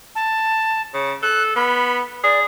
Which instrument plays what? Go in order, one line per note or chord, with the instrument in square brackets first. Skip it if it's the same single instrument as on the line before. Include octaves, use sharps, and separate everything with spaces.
[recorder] A5
[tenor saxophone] C#3
[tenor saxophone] A4 [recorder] F#6
[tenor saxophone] B3 [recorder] B5
[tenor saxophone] G#4 [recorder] D5